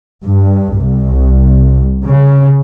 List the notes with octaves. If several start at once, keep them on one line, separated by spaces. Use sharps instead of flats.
G2
C2
C#3